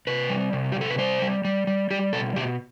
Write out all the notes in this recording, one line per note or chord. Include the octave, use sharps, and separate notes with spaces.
C3 B4
G3
C3
G4
C3 A4
B4
G3 C5
G3
G3
G3
G3 G4
B2 A4
B2 G4